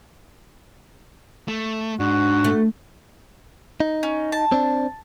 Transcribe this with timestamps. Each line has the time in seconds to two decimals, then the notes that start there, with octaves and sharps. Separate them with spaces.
1.48 A3
1.99 G#2 D4 F#4
2.44 A3
3.80 D#4
4.03 C#4
4.32 A5
4.52 C4 D4